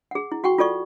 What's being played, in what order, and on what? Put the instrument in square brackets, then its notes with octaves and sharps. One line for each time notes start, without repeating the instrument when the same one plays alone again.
[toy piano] G#4 F#5
E4
F#4 F#5 G5 C#6
F4 A4 D5 C#6